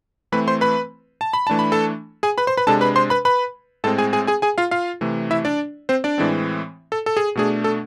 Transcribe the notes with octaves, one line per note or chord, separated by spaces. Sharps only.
E3 A3 C4 B4 B5
C5 C6
B4 B5
A5
B5
E3 A3 D4 A5
B5
A4 A5
G#4 G#5
B4 B5
C5 C6
B4 B5
C3 G#3 D4 A4 A5
B4 B5
C5 C6
B4 B5
B4 B5
A2 G#3 C4 A4 A5
G#4 G#5
G#4 G#5
G#4 G#5
G#4 G#5
F4 F5
F4 F5
C3 E3 A3
E4 E5
D4 D5
C4 C5
D4 D5
A2 E3 G#3 C4
A4
A4
G#4
B2 A3 D4 G#4
A4